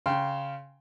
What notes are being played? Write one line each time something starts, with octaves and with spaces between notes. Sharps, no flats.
C#3 G5 C6